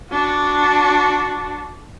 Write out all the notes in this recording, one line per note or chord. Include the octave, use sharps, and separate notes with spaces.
D4 F#4